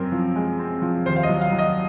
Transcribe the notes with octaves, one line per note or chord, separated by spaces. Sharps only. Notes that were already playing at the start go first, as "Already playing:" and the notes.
Already playing: F#2 C4 A#4
F3
G#3
C4
F3
D#2 C5
F5
D#5
F#3
F5
F#3
D#5